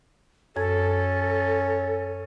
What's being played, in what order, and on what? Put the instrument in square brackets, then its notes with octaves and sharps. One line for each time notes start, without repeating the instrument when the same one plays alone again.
[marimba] F#2 G#6 [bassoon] C#4 [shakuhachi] A4